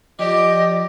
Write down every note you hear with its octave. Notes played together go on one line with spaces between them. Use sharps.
F3 G4 D5 D#5